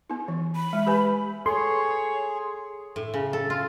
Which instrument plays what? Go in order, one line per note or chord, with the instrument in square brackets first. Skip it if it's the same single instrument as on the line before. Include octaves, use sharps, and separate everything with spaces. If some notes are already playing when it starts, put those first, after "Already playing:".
[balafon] B3 D#4
E3
[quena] B5
[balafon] G#3
G4 B4 G#5
[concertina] G#4 [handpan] A4 [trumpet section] C#5 [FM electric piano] C6
[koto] A2
C#3
A4
F4